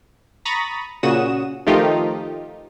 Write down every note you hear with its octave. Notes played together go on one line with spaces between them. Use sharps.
A#5 B5 C#6 D#6 A6 A#6
A#2 C#3 F#4 D#6 E7
D#3 F3 A3 D#4 F4 G4